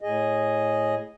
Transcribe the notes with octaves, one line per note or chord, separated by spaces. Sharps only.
A2 G#4 D#5